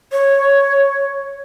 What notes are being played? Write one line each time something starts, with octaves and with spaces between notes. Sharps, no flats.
C#5